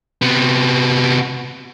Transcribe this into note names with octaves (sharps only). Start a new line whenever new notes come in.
C3 B3